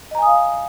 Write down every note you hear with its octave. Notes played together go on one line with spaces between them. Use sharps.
D#5 F5 G#5 A#5 D#6